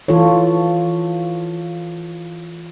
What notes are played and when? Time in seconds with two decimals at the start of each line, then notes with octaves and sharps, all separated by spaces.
0.08 E3 F4 A4 C#5